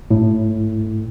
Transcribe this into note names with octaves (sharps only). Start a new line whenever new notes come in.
A2